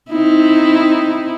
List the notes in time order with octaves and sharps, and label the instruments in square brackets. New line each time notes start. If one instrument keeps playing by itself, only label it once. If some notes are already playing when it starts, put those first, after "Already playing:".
[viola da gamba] C4 D#4 E4